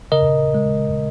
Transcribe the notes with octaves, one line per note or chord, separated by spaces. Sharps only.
C#3 A#4 D#5
G#3